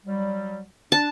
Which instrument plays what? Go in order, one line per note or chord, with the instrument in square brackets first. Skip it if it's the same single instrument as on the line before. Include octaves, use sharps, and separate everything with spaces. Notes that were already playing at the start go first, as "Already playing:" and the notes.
[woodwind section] F#3 G3
[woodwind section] D4 [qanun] A5